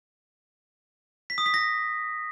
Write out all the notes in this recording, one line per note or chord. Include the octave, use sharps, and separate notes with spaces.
B6
D#6
B6
A#6